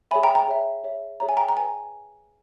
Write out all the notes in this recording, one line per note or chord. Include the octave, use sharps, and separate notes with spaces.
G#4 C#5 E5 G#5 B5
G5 A#5
G5 A#5
G#4 C#5 E5
G#4 C#5 E5
G#4 C#5 E5 A#5
G#5
G5 A#5
A#5
B4 G#5